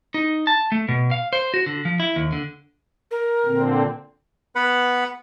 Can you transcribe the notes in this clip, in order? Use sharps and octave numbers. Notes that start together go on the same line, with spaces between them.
D#4
A5
A3
B2
F5
C5
F#4
D3
F3
E4
D#2
D3
A#4
A#2 D3 C4
B3 B4 F#5 B5